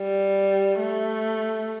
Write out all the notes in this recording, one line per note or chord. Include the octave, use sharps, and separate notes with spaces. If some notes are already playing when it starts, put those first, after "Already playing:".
Already playing: G3
A3